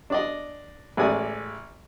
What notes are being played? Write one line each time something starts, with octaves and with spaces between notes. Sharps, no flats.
D4 D5 D#5
A1 G#3 D5 G#5 D#6